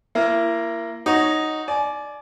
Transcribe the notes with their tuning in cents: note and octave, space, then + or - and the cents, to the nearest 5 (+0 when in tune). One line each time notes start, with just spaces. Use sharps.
A#3 +0 E4 +35
D#4 +0 F#4 +0 C#5 +0
D5 +0 G#5 +35